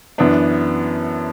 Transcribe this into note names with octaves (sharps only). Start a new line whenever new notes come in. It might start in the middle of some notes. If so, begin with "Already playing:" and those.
F#2 E3 B3 D4